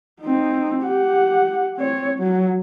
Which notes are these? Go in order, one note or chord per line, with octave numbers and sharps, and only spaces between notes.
C4 D#4
G4 F#5
C4 C#5
F#3